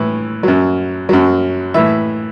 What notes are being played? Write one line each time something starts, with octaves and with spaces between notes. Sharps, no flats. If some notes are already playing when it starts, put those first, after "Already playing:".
Already playing: A2 E3
F#2 F#3
F#2 F#3
A2 E3 E5